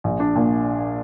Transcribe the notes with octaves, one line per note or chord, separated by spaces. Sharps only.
A#1
D4
A#2